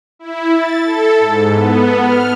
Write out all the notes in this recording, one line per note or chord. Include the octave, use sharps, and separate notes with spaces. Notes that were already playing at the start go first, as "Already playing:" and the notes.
E4
A6
A4
G#2
B3
F6